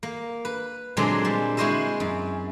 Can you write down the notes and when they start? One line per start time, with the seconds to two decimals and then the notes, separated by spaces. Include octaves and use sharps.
0.03 A#3
0.45 B4
0.97 A#2 D3 F#3 G#3 C4 D4
1.25 G3
1.57 G#3 E4 F#4 C5 D#5 E5
2.00 F#2